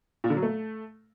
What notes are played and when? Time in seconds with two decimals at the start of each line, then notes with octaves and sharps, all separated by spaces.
0.24 A#2
0.30 D3
0.36 F#3
0.42 A3